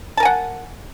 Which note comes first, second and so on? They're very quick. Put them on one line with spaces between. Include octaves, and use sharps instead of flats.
A5 A#4 G#5 F#5